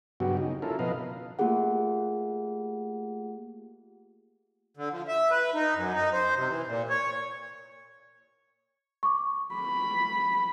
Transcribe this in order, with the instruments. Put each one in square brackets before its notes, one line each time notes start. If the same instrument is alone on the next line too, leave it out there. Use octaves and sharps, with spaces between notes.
[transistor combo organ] G2 C#3 F#3 B3 F#4 G4
C#3 D#4
C#4 E4 F4 A4 A#4
B2 F3 B4 D#5 F5
[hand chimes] A3 A#3 F4 G4 G#4 F#5
[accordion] D3
F3
E5
B4
D#4
F#2
D#4
C5
C3
E3
A#2
C#5
[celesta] C#6 D6
[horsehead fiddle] B5